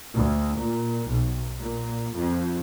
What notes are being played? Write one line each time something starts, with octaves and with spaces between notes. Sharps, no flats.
D2
A#2
B1
A#2
F2